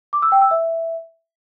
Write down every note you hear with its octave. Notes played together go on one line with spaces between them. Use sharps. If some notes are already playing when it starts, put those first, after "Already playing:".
D6
E6
G5
E6
E5